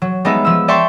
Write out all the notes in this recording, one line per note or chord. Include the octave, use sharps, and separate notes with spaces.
F#3
G3 G#3 B3 D#4 E5
F3 E6
D5 E5 G5 A5 C6 C#6